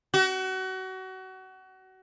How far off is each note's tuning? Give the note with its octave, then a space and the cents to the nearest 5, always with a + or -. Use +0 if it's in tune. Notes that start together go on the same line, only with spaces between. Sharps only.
F#4 +30